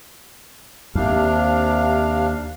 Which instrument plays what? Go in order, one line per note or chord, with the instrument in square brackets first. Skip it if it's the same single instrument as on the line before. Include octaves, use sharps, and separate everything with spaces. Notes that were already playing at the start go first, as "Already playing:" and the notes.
[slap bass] D#2 [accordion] C3 D4 F5